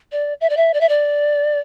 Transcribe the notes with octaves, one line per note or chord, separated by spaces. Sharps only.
D5
E5
D5
E5
D5
E5
D5